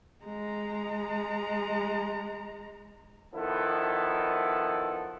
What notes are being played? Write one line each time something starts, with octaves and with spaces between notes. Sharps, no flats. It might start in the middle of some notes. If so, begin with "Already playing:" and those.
G#3 A#5
D#3 F3 B3 E4 A4